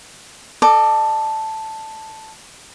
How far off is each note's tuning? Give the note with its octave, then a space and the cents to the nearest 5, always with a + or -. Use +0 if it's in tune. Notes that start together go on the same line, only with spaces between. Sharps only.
A4 +0 D#5 -45 D6 +5